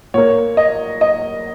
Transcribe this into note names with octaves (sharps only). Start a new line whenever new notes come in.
A#2 A#3 C#5
D#5
D#5